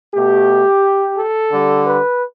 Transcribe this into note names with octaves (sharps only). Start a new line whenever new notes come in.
B2 A3 G4
A4
D3 G3
B4